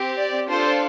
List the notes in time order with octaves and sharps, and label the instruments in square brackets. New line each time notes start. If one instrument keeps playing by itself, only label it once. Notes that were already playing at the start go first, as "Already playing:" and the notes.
Already playing: [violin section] C4 G4
D5
D4 F4 A4 C5